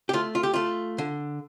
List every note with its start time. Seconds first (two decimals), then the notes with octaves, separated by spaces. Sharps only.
0.09 G4
0.13 A3 F4
0.35 F4
0.43 G4
0.54 A3 F4
0.98 D3